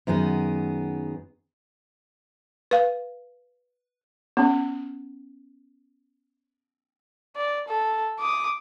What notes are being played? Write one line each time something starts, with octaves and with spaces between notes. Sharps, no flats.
F#2 D#3 B3 G#4
B4 F5
B3 C#4
D5
A4
D6 D#6